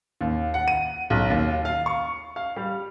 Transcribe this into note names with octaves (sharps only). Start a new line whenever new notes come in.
D#2
F#5
D#7
B1
D#2
F5
C#6
F5
G3